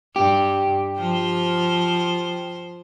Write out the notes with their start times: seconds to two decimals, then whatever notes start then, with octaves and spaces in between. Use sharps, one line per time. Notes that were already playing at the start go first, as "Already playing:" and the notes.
0.16 G2 G4
0.98 F3 C5